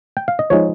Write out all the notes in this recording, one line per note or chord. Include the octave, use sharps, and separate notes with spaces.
G5
F5
D#5
F3 G#3 D#4 C#5